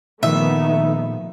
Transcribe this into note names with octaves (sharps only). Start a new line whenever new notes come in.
A#2 D#3 F3 A3 B3 D#4 E5